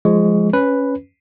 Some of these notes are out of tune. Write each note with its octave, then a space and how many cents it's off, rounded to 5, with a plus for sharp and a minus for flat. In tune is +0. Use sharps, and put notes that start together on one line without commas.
F3 +0 G#3 +0 C#6 +20
C#4 +0 B4 +0